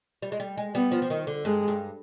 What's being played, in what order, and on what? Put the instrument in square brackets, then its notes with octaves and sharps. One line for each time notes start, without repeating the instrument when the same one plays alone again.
[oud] G3
G#3
G3
G#3
[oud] G3 [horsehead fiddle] B3
[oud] F3
F3
D#3
D3
[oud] G2 [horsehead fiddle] G#3
[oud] G2